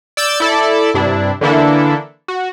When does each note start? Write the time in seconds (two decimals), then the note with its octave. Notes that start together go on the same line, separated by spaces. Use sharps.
0.17 D5 E6 G6 A6
0.40 E4 A4 D5
0.94 G2 C3 D4 E4
1.41 D3 E3 A#3 D4 E4 A4
2.28 F#4